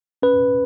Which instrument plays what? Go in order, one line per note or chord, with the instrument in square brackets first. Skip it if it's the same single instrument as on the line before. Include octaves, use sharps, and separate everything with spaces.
[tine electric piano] C#4 B4